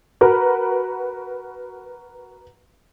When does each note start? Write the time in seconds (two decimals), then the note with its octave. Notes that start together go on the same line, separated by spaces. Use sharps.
0.21 F#4 A#4 B4